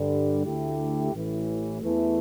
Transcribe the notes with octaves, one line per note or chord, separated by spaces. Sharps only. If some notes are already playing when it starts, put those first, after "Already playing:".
Already playing: G2 D3 G3
D2 D3 A3 E4 G4
A1 A2 E3
E2 E3 A3